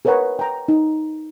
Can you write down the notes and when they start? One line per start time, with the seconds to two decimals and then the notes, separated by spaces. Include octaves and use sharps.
0.05 G#4 A#4 B4 C#5 F#5 A#5
0.39 G5 A#5
0.68 D#4